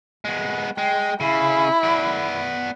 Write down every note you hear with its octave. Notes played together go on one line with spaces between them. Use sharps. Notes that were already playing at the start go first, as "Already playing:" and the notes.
G#3 B3
G#3 G5
C#3 E4
B3 D5